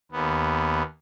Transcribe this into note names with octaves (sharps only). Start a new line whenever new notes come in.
D#2 B3